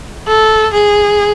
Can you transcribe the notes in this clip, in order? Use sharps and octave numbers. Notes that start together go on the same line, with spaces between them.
A4
G#4